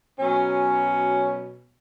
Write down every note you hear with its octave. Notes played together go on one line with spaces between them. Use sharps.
B2 F#3 C#4